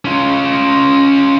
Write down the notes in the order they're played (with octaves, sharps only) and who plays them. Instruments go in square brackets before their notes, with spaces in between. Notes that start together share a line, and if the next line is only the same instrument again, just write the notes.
[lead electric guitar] C#4 F4